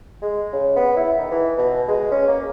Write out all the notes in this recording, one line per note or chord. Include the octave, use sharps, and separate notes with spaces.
G#3
C#3
B3
E4
D#3
E3
B2
G#3
C#4
A#3